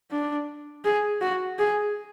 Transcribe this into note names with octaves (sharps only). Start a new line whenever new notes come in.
D4
G#4
F#4
G#4